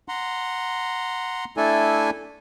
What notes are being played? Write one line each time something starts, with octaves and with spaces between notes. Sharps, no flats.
F#5 A#5 C6
A3 D4 E4 A4 G#5